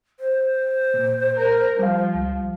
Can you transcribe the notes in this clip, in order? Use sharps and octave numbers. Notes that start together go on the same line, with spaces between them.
C5
A#2
A#4
F3 G3 F5
C#2